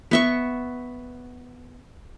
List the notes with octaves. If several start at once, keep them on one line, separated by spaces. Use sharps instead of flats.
B3 E5 C#6